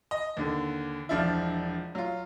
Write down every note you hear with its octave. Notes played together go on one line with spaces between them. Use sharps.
D#5
D#2 D3
E1 F3 D4 E4
F#3 F4